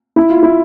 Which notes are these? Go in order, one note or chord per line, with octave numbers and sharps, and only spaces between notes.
E4
F4
E4